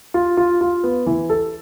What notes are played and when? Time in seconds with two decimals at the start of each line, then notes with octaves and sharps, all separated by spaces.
0.14 F4
0.37 F4
0.61 F4
0.84 B3
1.07 E3
1.30 A4